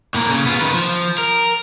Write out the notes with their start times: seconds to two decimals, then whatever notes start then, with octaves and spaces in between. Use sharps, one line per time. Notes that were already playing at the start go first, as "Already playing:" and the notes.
0.14 A2 A#3
0.30 C#3
0.46 B3 F4
0.61 D#3 B4
0.74 F3
1.18 A#4